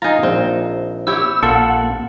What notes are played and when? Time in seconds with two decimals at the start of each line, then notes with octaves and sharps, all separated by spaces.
0.02 D#4 F4 G#5 A#5
0.23 A#1 C4
1.07 E4 G4 C#5 E6
1.43 A#1 A#3 F4 A4 E5 F#5